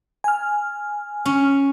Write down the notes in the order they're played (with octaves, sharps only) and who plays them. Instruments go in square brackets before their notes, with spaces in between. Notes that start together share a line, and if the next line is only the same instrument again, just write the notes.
[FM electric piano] G#5 F6
[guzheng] C#4